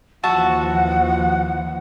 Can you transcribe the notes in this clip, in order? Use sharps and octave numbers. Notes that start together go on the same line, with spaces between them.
D#2 E3 F3 F#4 E5 F#5 A5